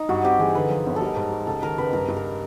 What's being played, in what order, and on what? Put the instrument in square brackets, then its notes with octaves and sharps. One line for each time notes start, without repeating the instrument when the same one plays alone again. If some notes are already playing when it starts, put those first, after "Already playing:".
Already playing: [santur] D#4
[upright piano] G2 [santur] F#4
[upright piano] C4 [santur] G4
[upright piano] E3 [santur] G#4
[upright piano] D3 [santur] B4
[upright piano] F3
G1
[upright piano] G3 [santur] A4 A#4
[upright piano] G#2
G3
[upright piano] C#2 [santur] A4
[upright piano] D#3 [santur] A#4
[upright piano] C#2 [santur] B4
[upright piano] G2 [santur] A#4
[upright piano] G2
[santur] A#4